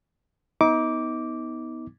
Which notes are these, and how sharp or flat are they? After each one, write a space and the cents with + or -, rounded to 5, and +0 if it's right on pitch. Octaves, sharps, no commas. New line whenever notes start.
B3 +0 D#4 +30 D6 -10